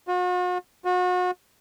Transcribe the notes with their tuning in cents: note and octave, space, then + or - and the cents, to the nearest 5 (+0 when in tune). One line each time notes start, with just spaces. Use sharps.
F#4 -45
F#4 -35